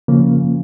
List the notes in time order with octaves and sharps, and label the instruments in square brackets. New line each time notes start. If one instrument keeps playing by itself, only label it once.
[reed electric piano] C#3 F3 A#3